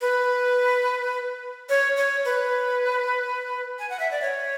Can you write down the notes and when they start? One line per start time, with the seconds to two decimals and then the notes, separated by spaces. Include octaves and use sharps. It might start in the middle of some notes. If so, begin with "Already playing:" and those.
0.01 B4
1.69 C#5
1.97 C#5
2.25 B4
3.79 G#5
3.89 F#5
4.00 E5
4.11 D5
4.22 C#5